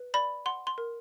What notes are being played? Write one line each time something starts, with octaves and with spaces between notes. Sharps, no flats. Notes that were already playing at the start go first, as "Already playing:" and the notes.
Already playing: B4
D5 B5
F#5 C6
C6
A#4